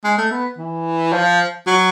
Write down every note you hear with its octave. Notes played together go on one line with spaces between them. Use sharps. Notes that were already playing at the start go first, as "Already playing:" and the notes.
G#3
A3
B3
E3
F3
F#3